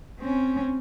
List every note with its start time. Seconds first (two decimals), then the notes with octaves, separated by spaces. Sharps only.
0.20 C4 C#4